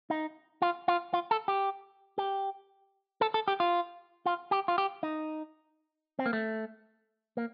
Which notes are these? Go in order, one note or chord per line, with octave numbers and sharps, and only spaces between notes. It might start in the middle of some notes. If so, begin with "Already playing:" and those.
D#4
F4
F4
F4
A4
G4
G4
A4
A4
G4
F4
F4
G4
F4
G4
D#4
C4
A#3
A3
A#3